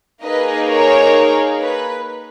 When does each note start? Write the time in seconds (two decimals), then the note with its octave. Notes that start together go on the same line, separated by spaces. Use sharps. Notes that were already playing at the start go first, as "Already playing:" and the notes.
0.23 A#3 D#4 G#4 B4 D#5
0.68 A#4 C#5
1.60 B4